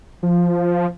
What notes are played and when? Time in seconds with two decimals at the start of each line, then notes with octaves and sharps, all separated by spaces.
0.23 F3